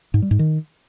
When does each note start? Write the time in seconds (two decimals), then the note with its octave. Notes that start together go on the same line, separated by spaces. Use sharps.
0.14 G#2
0.22 G3
0.31 G#2
0.39 D#3